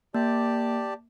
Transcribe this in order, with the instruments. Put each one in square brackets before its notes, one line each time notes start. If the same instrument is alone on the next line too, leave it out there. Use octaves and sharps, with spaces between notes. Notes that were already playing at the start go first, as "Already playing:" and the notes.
[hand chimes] A#3 [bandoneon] G4 D5 A5